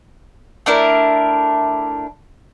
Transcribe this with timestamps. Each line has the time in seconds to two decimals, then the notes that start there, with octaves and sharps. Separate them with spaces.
0.66 A3 D4 E4 A#4